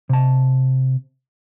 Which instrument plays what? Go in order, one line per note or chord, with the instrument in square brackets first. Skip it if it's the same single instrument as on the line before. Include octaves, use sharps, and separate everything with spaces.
[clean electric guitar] C3 A5